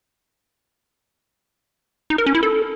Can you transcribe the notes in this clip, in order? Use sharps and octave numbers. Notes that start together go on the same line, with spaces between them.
D#4
A#4
C#4
E4
A4